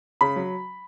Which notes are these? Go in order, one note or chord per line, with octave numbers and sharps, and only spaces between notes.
C#3 B5
F#3